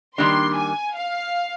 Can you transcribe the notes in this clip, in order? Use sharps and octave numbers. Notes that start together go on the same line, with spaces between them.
D#3 G3 A#3 D4 C6
G#5
F5